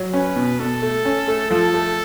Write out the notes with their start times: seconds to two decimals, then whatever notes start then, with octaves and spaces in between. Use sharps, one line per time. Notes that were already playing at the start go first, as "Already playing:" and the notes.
Already playing: F#3
0.14 C#4 B4
0.36 B2
0.59 B2 A4
0.82 A3
1.05 C#4
1.28 A3
1.50 F3 A4
1.74 A3